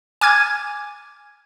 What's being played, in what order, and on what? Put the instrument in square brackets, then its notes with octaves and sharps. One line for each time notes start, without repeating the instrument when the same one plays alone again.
[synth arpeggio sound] G#5 D6 F6 G#6